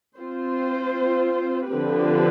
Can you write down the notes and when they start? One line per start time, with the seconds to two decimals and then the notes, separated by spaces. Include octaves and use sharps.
0.17 C4 F4 C5
1.70 D3 F3 C4 G4 B4